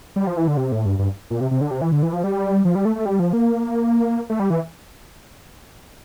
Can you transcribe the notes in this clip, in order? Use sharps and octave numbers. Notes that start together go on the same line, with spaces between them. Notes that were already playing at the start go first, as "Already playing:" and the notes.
G3
F3
E3
D3
C3
A2
G2
G2
A#2
C3
C3
D3
C3
E3
D3
E3
F3
G3
F3
G3
A3
A3
G3
F3
A#3
A3
G3
E3